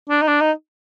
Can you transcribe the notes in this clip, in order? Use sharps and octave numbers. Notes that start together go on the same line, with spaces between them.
D4
D#4
D4
D#4